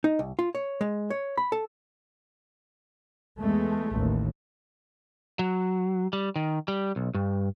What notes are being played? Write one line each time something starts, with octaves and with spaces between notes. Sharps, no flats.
D#4
C2
F4
C#5
G#3
C#5
B5
A4
E2 G#3 A3
A1 D#2
F#3
G3
D#3
G3
B1
G2